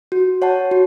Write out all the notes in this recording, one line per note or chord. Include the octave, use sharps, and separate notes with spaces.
F#4
C#5 F#5 A5
F#4